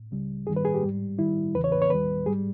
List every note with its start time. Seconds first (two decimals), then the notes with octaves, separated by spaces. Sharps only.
0.11 C#2 C#3 G3
0.47 G2 D#3 G3 G#4
0.56 B4
0.65 G#4
0.75 G4
0.83 G#2 G3
1.18 G2 D#3 G3 E4
1.54 E2 C#3 E3 B4
1.64 C#5
1.72 B4
1.82 C#5
1.90 D#2 D#3 G3 B4
2.26 G#2 G3 G#4